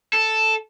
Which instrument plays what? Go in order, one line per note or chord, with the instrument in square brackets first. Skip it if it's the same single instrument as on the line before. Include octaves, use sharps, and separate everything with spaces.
[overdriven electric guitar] A4